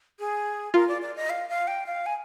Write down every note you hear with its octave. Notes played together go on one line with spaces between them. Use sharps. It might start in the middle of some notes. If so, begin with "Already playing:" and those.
G#4
F4 A#4
D5
D5
D#5
F5
F5
G5
F5
G#5